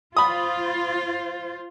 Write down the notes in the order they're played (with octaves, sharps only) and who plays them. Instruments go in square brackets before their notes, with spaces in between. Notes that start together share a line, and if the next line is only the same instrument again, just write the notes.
[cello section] F4 C5 [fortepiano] B5 D#6